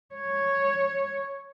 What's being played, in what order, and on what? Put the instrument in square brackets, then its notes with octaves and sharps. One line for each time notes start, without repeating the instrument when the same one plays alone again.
[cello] C#5